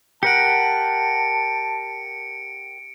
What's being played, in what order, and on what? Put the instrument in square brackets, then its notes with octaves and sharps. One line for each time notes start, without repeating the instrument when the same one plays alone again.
[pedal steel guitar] G4 A#4 F#5 [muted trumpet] A5 [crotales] C#7 D7